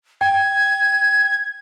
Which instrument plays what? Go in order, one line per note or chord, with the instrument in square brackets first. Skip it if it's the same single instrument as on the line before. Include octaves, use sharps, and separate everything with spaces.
[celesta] G5 [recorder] G#6